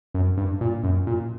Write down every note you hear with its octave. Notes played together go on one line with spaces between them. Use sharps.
F#2
G2
A#2
F#2
A#2